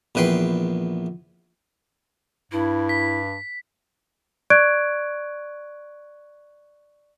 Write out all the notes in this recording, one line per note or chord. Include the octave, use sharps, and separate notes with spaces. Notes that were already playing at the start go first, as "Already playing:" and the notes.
A#1 E2 B4 G5 C6
G2 E4
B6
D5 C#6 F#6 G#6 D7